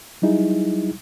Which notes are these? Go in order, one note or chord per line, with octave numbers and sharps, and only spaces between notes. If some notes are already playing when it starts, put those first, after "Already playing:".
F#3 G3 D#4 E4 G#4